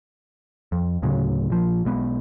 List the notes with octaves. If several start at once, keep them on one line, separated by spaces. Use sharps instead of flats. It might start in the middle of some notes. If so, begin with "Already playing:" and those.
F2
D2 A2 C#3 F#3
A#1 F3
B1 G#3 B3